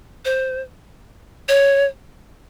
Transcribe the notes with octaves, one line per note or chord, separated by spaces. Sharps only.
C5
C#5